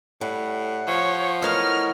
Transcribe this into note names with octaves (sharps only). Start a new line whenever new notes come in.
A2 G3 F#5
F3 C#5
E3 A3 B3 A#4 C#5 D#5 F6